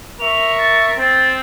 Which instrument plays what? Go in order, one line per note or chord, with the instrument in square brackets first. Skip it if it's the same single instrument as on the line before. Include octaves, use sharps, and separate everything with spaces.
[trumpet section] A#4 E5 C#6 [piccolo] F7
[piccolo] A6
[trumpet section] C4 [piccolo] A6